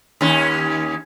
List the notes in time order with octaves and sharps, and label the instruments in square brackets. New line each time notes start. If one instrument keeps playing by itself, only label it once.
[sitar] D#2 C#4